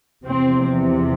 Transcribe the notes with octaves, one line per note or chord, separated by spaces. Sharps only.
E2 C3 F3 C4